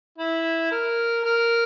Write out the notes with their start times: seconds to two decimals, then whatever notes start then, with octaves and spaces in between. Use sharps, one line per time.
0.18 E4
0.71 A#4
1.24 A#4